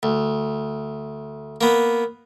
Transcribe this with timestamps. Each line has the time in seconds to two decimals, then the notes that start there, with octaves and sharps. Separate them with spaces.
0.03 D2
1.61 A#3 B3